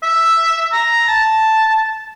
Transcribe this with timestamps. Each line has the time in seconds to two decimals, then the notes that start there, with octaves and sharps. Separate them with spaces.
0.03 E5
0.72 A#5
1.08 A5